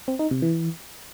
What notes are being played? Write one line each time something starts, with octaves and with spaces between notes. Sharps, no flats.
C4
D#4
C3
E3